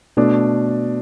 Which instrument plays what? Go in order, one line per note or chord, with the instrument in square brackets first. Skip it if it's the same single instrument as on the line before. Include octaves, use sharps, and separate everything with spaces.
[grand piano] B2 A3 D4